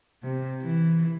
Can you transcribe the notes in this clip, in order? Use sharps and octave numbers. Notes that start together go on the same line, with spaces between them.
C3
E3